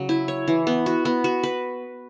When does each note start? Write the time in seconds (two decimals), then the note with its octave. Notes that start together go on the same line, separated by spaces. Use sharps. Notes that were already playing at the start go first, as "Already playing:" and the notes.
Already playing: C#3 F#3
0.09 E4
0.28 C#5
0.48 E3
0.67 B3
0.86 F#4
1.05 B3
1.24 F#4
1.43 B4